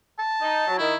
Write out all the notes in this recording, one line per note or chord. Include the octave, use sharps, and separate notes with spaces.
A5
D#4
F#3
D#3 E4